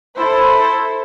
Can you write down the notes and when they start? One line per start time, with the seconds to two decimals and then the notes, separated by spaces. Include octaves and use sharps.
0.16 E4 A4 C5